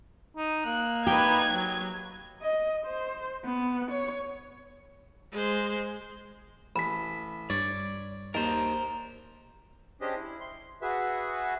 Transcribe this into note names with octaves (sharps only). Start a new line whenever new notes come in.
D#4
A#3 F#6
D#4 G4 B4 G#6
F#3
D#5
C5
B3
C#5
G#3 C5
A1 B5 B6
G2 C#5 D5
D#2 D#4 A#4 C5 A5
C#4 D4 G4 G#4 C5 D#5
E4
C6
F#4 G#4 B4 E5